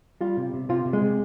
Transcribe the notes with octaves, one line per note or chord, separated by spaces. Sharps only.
G3 F4
C3
C3
C3 F4
C3
G#3
C3